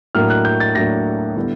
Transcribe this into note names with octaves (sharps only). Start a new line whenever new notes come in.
A2 F#3 A#3 D4 F6
F#6
G6
A6
A2 F#3 A#3 D4 A#6
D3 G3 B3 E4